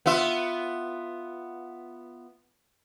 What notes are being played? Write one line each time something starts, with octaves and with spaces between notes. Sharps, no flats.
B3 F4 E5